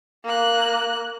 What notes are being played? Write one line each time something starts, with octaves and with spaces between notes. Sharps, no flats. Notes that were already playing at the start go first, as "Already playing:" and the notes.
A#3 F#6